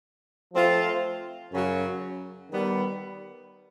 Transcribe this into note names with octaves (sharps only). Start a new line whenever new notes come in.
F3 A3 C4 F4
F#2 C#3 F#3
D#3 G3 B3